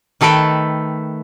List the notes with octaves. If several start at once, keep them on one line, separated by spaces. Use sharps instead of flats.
D#3 A3 A4 B4 G5